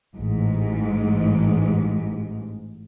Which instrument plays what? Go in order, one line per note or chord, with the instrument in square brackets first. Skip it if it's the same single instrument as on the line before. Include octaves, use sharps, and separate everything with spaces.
[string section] A1 G#2